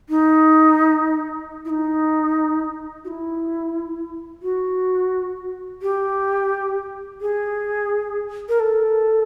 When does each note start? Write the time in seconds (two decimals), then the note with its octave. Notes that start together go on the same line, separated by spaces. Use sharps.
0.09 D#4
1.65 E4
1.70 D#4
3.04 F#4
3.08 E4
4.42 F#4
5.82 G4
7.21 G#4
8.49 A#4
8.60 A4